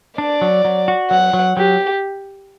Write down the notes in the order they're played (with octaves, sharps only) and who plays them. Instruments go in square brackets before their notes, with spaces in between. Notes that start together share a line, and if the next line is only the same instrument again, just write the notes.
[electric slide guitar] D4 [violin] D5
[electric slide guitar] F#3
F#3
F#4
[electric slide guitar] F#3 [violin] F#5
[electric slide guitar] F#3
[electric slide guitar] F#3 [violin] G4